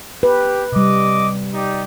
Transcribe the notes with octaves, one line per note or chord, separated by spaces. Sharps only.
G4 B4
C3 G3 D#5 D6
D#4 G4 D5